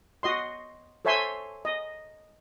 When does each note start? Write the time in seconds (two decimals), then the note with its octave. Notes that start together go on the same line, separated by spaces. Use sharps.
0.23 F#4 D#5 C6
1.05 A4 C5 C#5 E5 G#5 C6
1.65 D#5